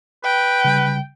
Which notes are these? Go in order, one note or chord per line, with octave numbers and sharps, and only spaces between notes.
B4 G5
C#3 G3